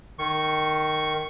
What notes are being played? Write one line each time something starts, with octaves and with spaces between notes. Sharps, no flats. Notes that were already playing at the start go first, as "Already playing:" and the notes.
D#3 C#6